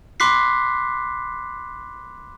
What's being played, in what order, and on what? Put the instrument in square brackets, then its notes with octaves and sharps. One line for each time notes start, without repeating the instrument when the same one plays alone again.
[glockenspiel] B5 C6 D6 F#6 B6 C7